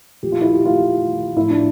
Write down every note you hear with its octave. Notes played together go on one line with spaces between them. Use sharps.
A#2 F3 G4
F4
E4
G4
F4
A2 F3 E4
D4